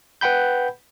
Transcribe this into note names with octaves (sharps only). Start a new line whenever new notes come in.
B4 F#5 G5 B5 G6